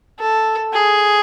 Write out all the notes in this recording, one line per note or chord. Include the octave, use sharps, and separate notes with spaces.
A4
G#4